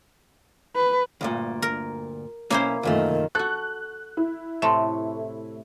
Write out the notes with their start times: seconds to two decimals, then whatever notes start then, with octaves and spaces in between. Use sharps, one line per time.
0.76 B4
1.21 D2 G2 A#2
1.62 A#4
2.50 B1 A#3 C#4 E4 C5
2.83 C2 F#2 A#2 D#3 A3
3.35 F#4 A4 F#6
4.17 E4
4.62 A2 C3 A3 E5 A5 C6